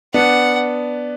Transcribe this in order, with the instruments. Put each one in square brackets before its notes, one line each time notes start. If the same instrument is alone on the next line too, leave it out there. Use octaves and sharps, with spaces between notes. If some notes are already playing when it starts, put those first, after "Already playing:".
[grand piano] B3 D4 [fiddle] F#5